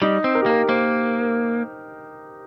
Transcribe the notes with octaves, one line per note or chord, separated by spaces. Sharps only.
G3 D#4
C4
A#4
G4
A#3 A#4
A#3 C5